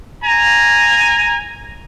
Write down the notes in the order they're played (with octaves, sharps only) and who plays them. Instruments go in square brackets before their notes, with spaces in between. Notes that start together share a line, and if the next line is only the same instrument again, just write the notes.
[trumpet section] G#5 A#5